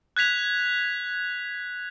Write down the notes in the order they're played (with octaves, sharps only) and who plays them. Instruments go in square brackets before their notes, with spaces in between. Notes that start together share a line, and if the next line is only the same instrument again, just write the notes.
[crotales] F#6 G#6 B6 F7